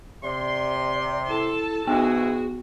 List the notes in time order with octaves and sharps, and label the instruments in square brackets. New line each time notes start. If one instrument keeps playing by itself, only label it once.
[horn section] C3 C6 [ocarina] D5
[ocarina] E4 [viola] A4 A5
[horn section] G#2 E3 G#3 [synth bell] B3 [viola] F#4 [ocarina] G#4